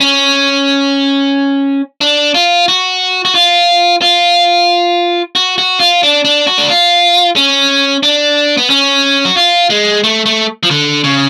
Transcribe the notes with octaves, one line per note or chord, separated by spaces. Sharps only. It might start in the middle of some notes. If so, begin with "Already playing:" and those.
C#4
D4
F4
F#4
F#4
F4
F4
F#4
F#4
F4
D4
D4
F#4
D4
F4
C#4
D4
B3
C#4
F#4
F4
G#3
A3
A3
F3
D3
C#3